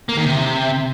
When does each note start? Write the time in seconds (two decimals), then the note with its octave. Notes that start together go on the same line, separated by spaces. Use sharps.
0.09 A#3
0.17 D#3
0.25 C3